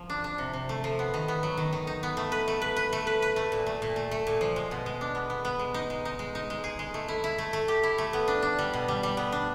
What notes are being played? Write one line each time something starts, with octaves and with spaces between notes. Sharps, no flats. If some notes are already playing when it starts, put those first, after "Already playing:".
Already playing: F3
D4
D4
C3
C3
A3
F3
B3
D#3
B3
F#3
D#3
D#3
D#4
B3
A3
B4
A3
B4
B4
A3
B4
B4
A3
A#2
A3
A#2
A3
A3
A#2
F3
G#3
B2
G#3
D4
B3
B3
B3
G#3
D#4
G#3
D#4
G#3
D#4
G#3
G#4
G#3
A3
E4
E4
A3
A3
G4
E4
A3
B3
D4
D4
G3
B2
G3
G3
B3
D4